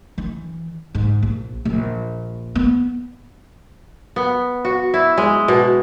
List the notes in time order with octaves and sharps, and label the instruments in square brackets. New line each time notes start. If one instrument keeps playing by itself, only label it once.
[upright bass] E3
G#2
A#1
A#1
B3
[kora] B3
F#4
E4
G#3
B2